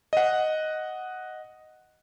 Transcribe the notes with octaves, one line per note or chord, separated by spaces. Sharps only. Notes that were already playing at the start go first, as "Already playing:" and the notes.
D#5 F#5